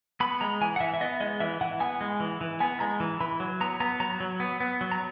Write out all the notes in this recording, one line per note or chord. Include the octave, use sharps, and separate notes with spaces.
B3 B5
G#3 A#5
E3 G#5
F#5
E3 E5
E5
B3 D#5
G#3 D#5
E3 E5
E3 F#5
B3 G#5
G#3
E3
E3
B3 G#5
G#3 A#5
E3
E3 B5
F#3
B3 A#5
B3 A#5
F#3 A#5
F#3
B3
B3
F#3
A#5